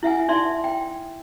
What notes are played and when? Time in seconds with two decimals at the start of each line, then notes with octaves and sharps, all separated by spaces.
0.03 E4 E5 F#5 G#5
0.28 D#4 D5 E5 C6
0.64 G5